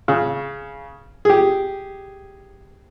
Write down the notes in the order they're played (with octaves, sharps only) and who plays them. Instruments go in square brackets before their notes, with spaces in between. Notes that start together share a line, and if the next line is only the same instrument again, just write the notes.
[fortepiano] C#3
G4 G#4